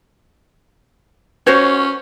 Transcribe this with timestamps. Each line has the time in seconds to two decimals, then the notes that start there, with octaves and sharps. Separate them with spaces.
1.47 C#4 F#4 C5 C#5